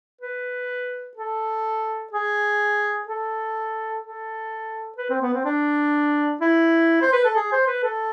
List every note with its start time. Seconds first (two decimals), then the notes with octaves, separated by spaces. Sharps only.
0.21 B4
1.17 A4
2.13 G#4
3.07 A4
4.02 A4
4.98 B4
5.10 C4
5.22 B3
5.34 C4
5.45 D4
6.41 E4
7.02 C5
7.13 B4
7.25 A4
7.36 G#4
7.52 C5
7.67 B4
7.84 A4